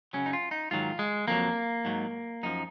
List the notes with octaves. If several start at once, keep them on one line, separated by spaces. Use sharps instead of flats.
F#2 C#3 F#3 C#4
D#4
F4
D#4
G#2 D#3 F#3 F4
G#3
F2 D#3 F#3 A#3
G#2 F#3
F#2 F3 D#4